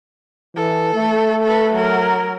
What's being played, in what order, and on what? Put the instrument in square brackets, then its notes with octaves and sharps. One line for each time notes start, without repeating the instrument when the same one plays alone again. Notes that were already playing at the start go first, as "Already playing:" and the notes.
[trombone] E3 [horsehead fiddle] A4
[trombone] A3
[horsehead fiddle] A4 B4
F#3 A#4